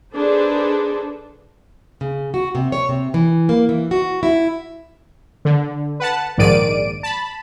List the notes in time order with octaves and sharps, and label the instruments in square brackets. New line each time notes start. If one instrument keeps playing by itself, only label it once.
[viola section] D4 D#4 G#4 A4 B4 C5
[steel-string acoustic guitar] C#3
F#4
C3
C#5
C3
E3
A#3
E3
F#4
E4
[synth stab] D3
B4 F#5 A5
A#1 G#2 D#3 D5 D7 D#7
A5 B5